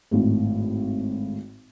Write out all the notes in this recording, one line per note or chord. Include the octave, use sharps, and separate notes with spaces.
G#1 A2